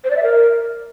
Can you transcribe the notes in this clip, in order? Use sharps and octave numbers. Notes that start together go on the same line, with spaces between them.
C5
D5
E5
A#4